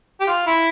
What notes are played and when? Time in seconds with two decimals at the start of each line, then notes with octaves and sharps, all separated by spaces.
0.21 G4
0.27 F4
0.47 E4